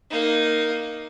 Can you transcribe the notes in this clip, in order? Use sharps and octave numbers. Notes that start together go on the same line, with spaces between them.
A#3 D#4